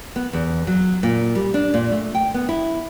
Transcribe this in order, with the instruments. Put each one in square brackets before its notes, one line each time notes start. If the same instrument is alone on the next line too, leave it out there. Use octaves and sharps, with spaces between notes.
[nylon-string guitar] B3
E2
F#3
A#2
G3
D4
A#2
A3
G5
B3
E4